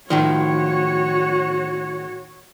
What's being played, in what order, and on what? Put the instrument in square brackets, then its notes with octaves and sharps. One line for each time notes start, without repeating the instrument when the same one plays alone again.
[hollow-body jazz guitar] A2 D#3 F3 [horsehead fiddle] F#4 C#5